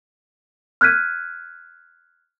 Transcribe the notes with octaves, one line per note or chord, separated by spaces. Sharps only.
F6 F#6 G#6 B6 D#7